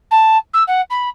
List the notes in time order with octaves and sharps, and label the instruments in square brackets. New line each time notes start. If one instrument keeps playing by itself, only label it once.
[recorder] A5
E6
F#5
B5